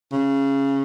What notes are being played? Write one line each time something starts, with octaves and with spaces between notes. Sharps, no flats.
C#3